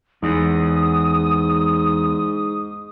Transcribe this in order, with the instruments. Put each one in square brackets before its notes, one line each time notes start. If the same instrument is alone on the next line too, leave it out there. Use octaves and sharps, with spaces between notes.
[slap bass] E2 [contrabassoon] G#2 [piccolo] D#6